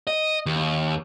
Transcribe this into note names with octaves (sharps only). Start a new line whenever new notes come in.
D#5
D#2